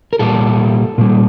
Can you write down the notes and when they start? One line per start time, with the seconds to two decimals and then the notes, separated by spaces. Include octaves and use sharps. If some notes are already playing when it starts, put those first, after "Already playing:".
0.13 A#4
0.19 A#2 G3 A4
0.98 A#2 G3